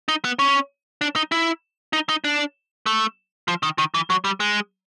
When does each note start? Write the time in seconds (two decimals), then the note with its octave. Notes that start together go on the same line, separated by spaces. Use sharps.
0.08 D#4
0.25 B3
0.39 C#4
1.01 D4
1.16 D#4
1.32 E4
1.93 D#4
2.09 D#4
2.24 D4
2.86 A3
3.48 F3
3.63 D#3
3.78 D#3
3.94 E3
4.10 F#3
4.25 G3
4.40 G#3